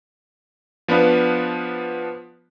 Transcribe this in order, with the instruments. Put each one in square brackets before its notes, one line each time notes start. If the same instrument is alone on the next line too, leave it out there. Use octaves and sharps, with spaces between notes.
[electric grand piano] F3 B3 D4 B4 F5